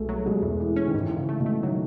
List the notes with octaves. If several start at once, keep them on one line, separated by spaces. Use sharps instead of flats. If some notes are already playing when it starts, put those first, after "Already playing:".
Already playing: B1 B2 G#3 A3
F#3
B2 G#3
E2
E2 E3
C#4
D#3
G#2 E3
G#2
C#3
A3
B2
A3
D#3 F#3